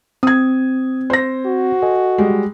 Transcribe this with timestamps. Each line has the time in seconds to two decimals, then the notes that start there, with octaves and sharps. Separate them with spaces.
0.23 C4 D#6 G#6
1.10 C5 A#6
1.46 F#4
1.82 A4 D#5 G#5
2.18 G3 G#3